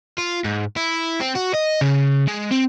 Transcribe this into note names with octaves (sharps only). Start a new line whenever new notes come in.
F4
G#2
E4
C4
F#4
D#5
C#3
G#3
C4